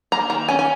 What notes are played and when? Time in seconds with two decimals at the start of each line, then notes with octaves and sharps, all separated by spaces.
0.12 A#3 A#5
0.30 D#3 A#5
0.48 C#4 G#5
0.59 G#5